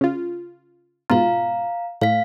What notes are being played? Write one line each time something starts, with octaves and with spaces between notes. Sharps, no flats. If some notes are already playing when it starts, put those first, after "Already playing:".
C#3 F4
G#2 B2 F4 F5 A#5
A2 F5 B6